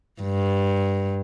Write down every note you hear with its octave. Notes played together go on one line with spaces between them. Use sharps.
G2